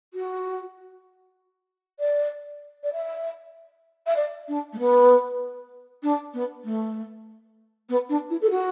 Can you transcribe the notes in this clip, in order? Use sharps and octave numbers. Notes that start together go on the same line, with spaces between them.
F#4
D5
D5
E5
E5
D5
D4
A3
B3
D4
B3
A3
B3
D4
E4
A4
F#4